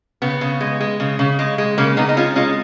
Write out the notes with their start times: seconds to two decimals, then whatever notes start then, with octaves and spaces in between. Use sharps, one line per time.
0.22 C#3 B3
0.41 C#3
0.61 G#3
0.80 G#3
1.00 C#3
1.19 C#3
1.39 G#3
1.58 G#3
1.78 C#3 A#3 C#4
1.97 C#3 B3 D#4
2.09 D#4
2.17 G#3 C#4 F4
2.36 G#3 C#4 F4